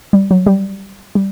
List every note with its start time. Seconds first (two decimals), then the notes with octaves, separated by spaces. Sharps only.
0.13 G3
0.31 F#3
0.46 G3
1.15 G3